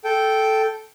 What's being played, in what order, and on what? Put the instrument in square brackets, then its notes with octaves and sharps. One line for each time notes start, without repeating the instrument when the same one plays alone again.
[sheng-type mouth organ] A4 G5